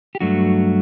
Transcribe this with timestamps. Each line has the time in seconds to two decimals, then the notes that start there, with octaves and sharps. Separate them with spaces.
0.15 G4
0.20 G2 F#3 A3 D4 F#4